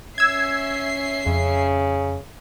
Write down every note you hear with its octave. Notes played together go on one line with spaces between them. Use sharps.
C#4 E5 E6 G#6 C7
F2 C#3